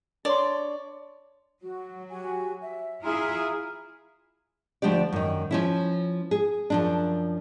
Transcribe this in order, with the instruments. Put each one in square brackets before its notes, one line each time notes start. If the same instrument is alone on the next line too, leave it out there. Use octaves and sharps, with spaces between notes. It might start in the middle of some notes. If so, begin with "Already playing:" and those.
[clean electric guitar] D4 C6 [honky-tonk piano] C#5 [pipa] D5
[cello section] F#3 [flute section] F#4
[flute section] F#4 G4 G#5
E5
[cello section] E4 F4 G#4 [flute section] E5 A#5 F6
[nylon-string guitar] D2 F3 D4 G4 D5
F#2 D#3
F3 C#4 E4
G#4
F#2 F3 D4